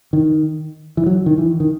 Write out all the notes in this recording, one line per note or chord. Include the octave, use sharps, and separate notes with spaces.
D#3
E3
F#3
D#3
E3
D#3